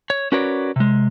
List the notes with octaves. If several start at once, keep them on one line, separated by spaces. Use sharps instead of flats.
C#5
C#4 F#4 A#4 B4 C#5 D5
C3 G#3